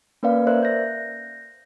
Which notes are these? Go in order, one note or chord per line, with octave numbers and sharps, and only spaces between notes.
A#3 C#4 A#4 B4 D5 F5
A#4 C5 D5 E5 F#6
G6 A#6